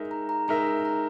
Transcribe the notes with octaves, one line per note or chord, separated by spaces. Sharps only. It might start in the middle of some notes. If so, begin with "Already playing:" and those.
Already playing: G#3 D#4 A#4 E5
A#5
A#5
G#3 D#4 A#4 E5 A#5
A#5
A#5